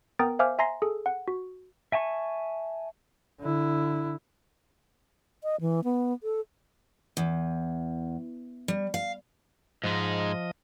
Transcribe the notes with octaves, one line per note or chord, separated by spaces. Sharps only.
B3 A#4 G5 A#5 D#6 A6
C5 E5 F5 G#5 D6 F6
E5 G#5 A#5 C6 A#6 C7
G#4 A4
F#5
F#4
E5 G#5 A5 C#6
D3 E4
D#5
E3
B3
A4
E2
G3
F5
G#2 F3 G#3 D#5